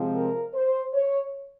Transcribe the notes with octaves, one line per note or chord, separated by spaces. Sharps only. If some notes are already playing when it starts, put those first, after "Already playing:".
Already playing: C3 F3 G#3 C4
A#4
C5
C#5